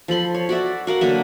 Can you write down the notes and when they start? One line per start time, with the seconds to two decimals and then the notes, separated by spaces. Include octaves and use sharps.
0.08 F3 A4 B5 C6
0.35 C#5
0.49 F#4 D5 E5
0.87 F#4 A#4 F5 F#5
1.01 D3 F#3 A#3 E5